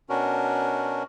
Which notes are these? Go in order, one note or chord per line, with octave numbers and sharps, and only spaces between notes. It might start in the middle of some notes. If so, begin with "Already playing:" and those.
B2 C#4 D4 F#4 A#4